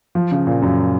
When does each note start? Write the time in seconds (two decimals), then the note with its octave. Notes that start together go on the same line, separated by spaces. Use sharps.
0.15 F3
0.32 C#3
0.47 A#2
0.62 F#2